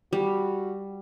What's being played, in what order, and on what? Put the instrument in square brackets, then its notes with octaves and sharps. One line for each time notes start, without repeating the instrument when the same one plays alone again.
[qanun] G3 [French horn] F#4